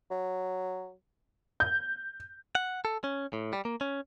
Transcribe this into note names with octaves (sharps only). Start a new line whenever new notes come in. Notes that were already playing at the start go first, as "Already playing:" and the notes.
F#3
G6
F#5
A4
C#4
A2
G3
A#3
C#4